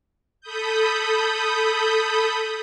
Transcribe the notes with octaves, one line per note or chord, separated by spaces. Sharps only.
A4 B5 D#6 G6